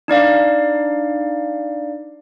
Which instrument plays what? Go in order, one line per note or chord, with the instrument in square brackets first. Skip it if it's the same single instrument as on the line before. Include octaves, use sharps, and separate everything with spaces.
[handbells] D4 D#4 D5 F5